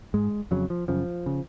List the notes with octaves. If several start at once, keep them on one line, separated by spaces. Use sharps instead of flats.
G#2 G#3
F2 C#3 F#3
F3
F#2 C#3 F3
C#3